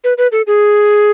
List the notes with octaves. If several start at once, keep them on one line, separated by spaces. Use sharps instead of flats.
B4
B4
A4
G#4